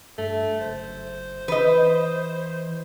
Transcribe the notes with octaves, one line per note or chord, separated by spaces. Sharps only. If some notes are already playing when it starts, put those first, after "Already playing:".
G2 A3
F#1 C5
E3 B4 D#5